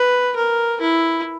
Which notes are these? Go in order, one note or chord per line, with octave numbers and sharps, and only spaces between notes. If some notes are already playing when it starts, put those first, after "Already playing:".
Already playing: B4
A#4
E4